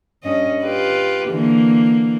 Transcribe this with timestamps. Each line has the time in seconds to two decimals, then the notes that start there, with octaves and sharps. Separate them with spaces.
0.23 G2 C#4 D#5
0.62 F4 G4 B4
1.29 D3 E3 A#3